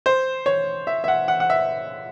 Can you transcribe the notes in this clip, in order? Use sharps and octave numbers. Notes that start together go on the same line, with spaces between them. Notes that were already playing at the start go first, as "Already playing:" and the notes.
C5
C#5
E5
E5
F#5
F#5
F#5
E5